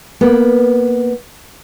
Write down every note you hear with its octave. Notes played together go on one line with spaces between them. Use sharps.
A#3 B3